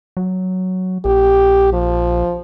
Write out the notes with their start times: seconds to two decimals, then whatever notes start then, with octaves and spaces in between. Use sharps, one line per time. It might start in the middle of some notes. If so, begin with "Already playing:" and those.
0.17 F#3
1.05 A#1 G4
1.73 F3